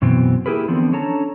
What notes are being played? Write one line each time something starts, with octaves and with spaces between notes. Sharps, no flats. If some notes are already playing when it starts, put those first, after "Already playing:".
F#2 B2 E3 B3 C4
A#3 E4 G4 G#4 A#4 B4
D3 E3 F3 B3 C4 D4
C#4 D4 A4 C#5 A5 A#5